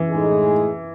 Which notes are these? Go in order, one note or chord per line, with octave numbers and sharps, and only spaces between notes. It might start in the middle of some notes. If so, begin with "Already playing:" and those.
Already playing: E3
A2 G#3 D#4 G#4